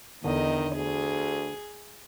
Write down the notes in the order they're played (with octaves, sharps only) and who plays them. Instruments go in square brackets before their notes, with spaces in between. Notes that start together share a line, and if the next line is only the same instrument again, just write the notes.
[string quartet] E2 D#5 [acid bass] D3 [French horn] D#3
[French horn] D2 [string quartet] G#4